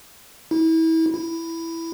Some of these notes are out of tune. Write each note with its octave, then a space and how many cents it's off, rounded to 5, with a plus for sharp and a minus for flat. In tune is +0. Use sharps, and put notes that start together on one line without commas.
E4 -30
E4 +5